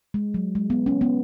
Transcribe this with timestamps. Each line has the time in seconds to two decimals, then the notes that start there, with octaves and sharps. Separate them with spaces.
0.14 G#3
0.34 F#3
0.55 G#3
0.70 B3
0.86 C#4
1.01 B3